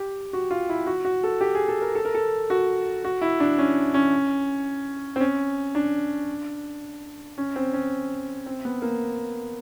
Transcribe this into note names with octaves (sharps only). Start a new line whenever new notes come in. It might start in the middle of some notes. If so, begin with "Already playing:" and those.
Already playing: G4
F#4
F4
E4
F#4
F#4
A4
G4
G#4
A4
A#4
A4
A#4
A4
F#4
F#4
E4
D4
C#4
C#4
C4
C#4
D4
C#4
C4
C#4
C4
B3
A#3